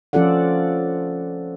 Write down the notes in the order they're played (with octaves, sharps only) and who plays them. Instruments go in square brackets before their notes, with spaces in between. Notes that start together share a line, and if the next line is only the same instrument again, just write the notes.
[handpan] F3 C#4 F4 A4 D5 F#5